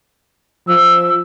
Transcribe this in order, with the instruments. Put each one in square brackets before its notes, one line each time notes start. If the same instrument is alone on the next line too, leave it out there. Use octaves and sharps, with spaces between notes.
[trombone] F3 [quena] E6